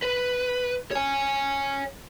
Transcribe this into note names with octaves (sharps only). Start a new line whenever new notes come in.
B4
C#5 G#5